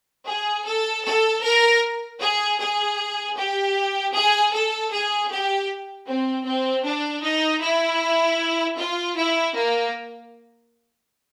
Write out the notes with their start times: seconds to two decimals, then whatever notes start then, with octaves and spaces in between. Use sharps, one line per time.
0.27 G#4
0.66 A4
1.05 A4
1.43 A#4
2.20 G#4
2.59 G#4
3.36 G4
4.14 G#4
4.53 A4
4.91 G#4
5.30 G4
6.07 C4
6.46 C4
6.85 D4
7.23 D#4
7.62 E4
8.78 F4
9.17 E4
9.55 A#3